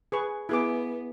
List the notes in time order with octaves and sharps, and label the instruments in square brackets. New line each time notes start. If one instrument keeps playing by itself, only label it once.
[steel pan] G#4 B4 C#6
[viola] B3 [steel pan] E4 G#4 D6